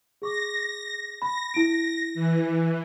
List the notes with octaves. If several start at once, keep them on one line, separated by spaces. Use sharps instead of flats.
G#4 C#6 D6 A#6
B5 A#6
E4 D7
E3